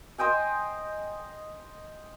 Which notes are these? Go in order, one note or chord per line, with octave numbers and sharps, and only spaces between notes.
C5 D#5 G5 G#5